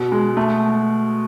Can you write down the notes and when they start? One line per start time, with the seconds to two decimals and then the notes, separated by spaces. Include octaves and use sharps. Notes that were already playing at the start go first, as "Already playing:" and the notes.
Already playing: B2
0.12 G#3
0.37 A3